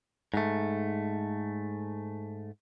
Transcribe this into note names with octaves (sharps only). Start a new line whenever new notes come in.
G#2 A3